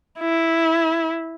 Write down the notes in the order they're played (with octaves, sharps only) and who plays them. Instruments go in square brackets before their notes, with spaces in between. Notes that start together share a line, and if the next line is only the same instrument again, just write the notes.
[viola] E4